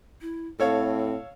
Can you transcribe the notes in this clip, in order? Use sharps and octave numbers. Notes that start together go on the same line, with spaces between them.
E4
A2 C4 A4 C#5 F5